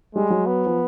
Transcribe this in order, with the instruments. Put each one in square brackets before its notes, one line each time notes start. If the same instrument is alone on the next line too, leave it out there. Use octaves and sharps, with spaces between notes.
[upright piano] G3 [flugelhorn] G#3
[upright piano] F#3
[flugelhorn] B3
[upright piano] F3